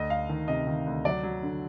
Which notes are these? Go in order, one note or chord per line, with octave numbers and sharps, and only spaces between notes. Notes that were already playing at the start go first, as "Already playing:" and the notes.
Already playing: D2 D#5
D2 F5
D#3
C3 D#5
D#3
D2
F#3 D5
F#3
D3